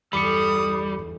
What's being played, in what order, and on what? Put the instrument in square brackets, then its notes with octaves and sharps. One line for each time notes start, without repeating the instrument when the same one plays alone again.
[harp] G1 E2 [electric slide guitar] G3 [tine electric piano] B5 D6 C#7 [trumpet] D#6